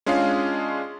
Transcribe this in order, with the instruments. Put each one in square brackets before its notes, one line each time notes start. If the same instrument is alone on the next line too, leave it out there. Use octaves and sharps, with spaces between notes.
[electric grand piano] G#3 C#4 D4 F4 G#4 F5